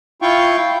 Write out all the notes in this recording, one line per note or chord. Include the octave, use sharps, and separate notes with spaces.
E4 F4 F5 G5 C#6